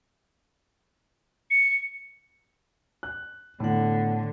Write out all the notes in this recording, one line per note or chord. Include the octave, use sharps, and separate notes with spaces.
C#7
F#6
A2 D3 B3 F#5